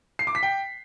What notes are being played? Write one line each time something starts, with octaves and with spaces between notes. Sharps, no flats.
C7
D6
B6
G5